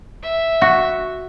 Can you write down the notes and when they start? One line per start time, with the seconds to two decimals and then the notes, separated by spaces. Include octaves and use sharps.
0.23 E5
0.62 F#4